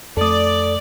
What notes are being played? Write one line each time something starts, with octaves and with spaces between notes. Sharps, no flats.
F2 A3 A4 D5 D#6